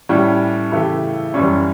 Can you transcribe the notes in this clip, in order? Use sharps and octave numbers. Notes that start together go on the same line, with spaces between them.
A2 G3 C#4
C#3 E3 A3 E4 G4
F#2 E3 G3 C#4